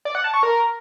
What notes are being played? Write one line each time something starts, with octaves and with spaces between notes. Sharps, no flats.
D5
F#5
A5
C#6
A#4